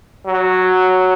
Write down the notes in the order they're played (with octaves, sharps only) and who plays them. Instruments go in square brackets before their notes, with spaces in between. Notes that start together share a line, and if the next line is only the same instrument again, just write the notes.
[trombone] F#3